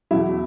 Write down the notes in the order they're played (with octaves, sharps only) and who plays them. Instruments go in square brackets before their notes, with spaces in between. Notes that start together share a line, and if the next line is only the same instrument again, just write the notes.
[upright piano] E2 B2 F#3 E4